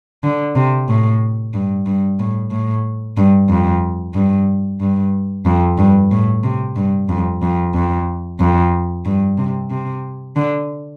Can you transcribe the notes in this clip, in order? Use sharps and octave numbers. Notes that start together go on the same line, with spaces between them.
D3
C3
A2
G2
G2
A2
A2
G2
F2
G2
G2
F2
G2
A2
C3
G2
F2
F2
F2
F2
G2
C3
C3
D3